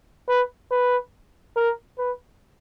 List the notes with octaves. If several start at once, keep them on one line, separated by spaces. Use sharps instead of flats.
B4
B4
A#4
B4